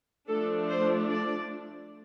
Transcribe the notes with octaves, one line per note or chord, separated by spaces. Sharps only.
F3 A3 D4 A4
C5
D5